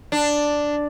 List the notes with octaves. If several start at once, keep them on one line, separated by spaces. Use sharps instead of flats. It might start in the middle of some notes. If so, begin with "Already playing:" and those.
D4